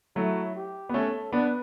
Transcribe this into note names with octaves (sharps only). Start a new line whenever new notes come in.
F#3 A3 E4
G4
B3
A3 C#4 A4
B3 D4 B4